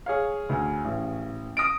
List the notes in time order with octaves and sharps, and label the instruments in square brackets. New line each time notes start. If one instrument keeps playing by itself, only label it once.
[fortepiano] G#4 C#5 F5
[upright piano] D2 G#5
A1
D#6 A#6 D7